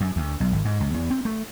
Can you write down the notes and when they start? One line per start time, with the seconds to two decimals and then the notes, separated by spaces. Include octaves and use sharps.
0.01 F#2
0.16 D2
0.40 B1
0.52 G#1
0.65 G#2
0.80 C#2
0.94 E2
1.11 C4
1.25 A3